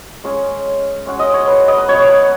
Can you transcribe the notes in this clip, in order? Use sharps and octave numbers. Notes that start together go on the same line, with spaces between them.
G#3 C#4 G#4 C#5
G#3 C#4 F#4
D#5
C#5
B4
D#5
B4
B2 F#3 C#4 C#5
B4